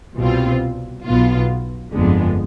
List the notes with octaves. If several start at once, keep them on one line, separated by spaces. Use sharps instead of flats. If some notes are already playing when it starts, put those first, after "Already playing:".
C2 B2 G3 C4 F4
B1 B2 B3 F4
G1 F2 D3 G#3 B3